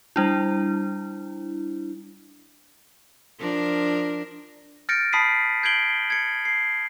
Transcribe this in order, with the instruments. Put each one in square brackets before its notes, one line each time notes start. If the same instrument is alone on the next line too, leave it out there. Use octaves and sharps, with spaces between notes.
[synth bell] G3 D4 E4
[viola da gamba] F3 D4 A#4
[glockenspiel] F6 G6 A6 A#6 C#7 D7
A5 B5 D#6 B6 C7 D#7
G6 G#6 C7 D7 F#7 G7
G#6 C#7
C7